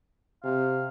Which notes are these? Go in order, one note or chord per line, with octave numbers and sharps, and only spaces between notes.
C3 F5